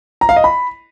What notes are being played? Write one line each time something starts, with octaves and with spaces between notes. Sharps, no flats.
A#5
F5
D#5
B5